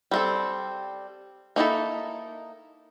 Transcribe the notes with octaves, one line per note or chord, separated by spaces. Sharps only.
G3 C4 A4
A#3 D#4 E4 A4